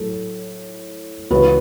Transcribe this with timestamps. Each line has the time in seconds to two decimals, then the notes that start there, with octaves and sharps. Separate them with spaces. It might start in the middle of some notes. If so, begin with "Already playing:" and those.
Already playing: A2 F#3 A4
1.30 C#2 C#3 E3 F#4 B4